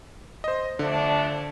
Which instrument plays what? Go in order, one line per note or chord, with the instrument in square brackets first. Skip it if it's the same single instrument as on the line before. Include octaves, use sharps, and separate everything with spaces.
[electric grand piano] C5 D#5
[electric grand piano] D3 [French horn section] F3 A3 D4